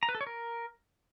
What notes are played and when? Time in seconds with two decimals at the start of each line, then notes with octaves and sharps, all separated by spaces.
0.03 A#5
0.09 B4
0.15 A4
0.21 C#5
0.27 A#4